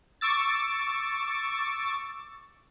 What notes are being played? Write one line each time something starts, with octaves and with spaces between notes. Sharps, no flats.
C#6 D6 E6 A6